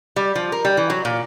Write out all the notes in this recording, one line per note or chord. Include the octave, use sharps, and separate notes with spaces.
G3
F3
A#4
G3
E3
F#3
A#2